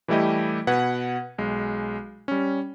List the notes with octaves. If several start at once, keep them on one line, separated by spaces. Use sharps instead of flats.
E3 G3 A3 E4 G4 D#5
B2 B4 F#5 G#6
B1 G#3
G3 C#4